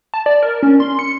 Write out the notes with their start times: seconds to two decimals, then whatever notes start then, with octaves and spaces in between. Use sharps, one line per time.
0.14 A5
0.26 D5
0.43 A#4
0.62 C#4
0.80 C6
0.99 C#7